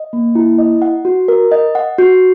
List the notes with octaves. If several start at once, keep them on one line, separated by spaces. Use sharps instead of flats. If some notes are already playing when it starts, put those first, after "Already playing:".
Already playing: D#5
A#3
E4
D#5
F#5
F#4
A#4
D#5
F#5
F#4